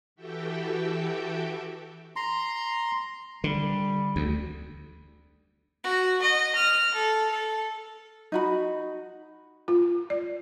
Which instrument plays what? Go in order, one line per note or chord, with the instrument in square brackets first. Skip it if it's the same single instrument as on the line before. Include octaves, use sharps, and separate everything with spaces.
[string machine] E3 F#4 G4 A4 E5 G5
[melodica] A#5 C6
[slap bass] D3 [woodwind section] G3
[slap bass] D2
[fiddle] F#4
D#5
F6
A4
A4
[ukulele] D#4 F#4 B5
[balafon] F4
D5